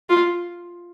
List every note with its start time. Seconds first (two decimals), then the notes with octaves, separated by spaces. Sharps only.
0.10 F4